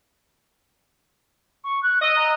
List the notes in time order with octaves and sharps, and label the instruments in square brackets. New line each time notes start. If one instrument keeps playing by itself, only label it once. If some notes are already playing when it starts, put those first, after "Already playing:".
[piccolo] C#6
F#6
[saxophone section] D#5 [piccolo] E6
[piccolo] A#5